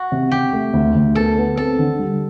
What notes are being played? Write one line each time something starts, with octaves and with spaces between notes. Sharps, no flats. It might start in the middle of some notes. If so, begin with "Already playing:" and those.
Already playing: F#4
C3
C3 G4
A3
D2
D2
B3 A4
B3
C4 A4
D3
G3